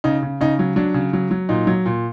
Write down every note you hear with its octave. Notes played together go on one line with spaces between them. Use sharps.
C#3 D#4
C#3
C#3 D#4
F#3
F#3 D4
C#3
F#3
F#3
A#2 D#4
F#3
A#2